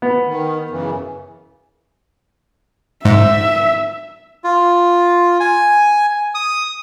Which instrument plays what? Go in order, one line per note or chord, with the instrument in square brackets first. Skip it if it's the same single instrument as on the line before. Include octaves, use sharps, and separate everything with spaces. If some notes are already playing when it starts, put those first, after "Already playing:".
[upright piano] B3
[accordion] D#3
F#2 C#3 E3
[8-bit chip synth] G#2 [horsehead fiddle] E5
[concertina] F4
G#5
D#6